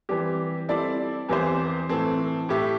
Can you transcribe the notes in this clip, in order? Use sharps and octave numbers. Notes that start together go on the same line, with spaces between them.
E3 G3 C4 G4
G3 C4 E4 A4 D5
E2 E3 C4 G4 C5
A2 E3 C4 A4
A2 A3 E4 G4 E5